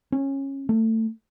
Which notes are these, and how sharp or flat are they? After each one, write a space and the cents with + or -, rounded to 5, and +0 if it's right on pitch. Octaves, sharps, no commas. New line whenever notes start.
C#4 -20
A3 +25